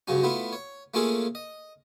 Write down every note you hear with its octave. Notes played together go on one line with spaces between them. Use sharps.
C#2 G2 C#3 F#3 C#4
A3 B3 E4 F4
C#5
A3 A#3 C#4 F4 G#4 A4
D#5